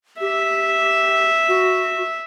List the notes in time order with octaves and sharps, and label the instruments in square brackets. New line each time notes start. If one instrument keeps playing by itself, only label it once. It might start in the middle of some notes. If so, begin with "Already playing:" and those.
[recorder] G4 [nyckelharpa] E5
[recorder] F#4